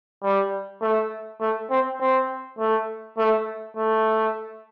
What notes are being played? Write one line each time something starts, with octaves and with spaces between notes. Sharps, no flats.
G3
A3
A3
C4
C4
A3
A3
A3